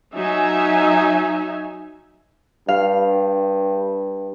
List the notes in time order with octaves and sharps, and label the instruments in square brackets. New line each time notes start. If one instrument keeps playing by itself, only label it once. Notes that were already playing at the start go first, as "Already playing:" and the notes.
[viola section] F#3 D#4 E5 G#5
[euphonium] G2 [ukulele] F5